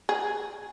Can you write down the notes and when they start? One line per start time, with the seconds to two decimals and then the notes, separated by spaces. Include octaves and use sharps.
0.09 G#4